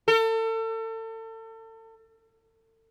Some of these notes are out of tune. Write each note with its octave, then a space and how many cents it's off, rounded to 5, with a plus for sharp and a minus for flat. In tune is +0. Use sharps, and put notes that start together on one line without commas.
A4 +35